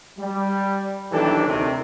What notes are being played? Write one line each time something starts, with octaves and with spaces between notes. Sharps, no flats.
G3
B1 D#3 E3 D4 G4 A4
D2 C3 D#3